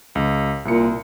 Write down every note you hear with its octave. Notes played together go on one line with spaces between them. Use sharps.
C#2
C2 A#2 C#7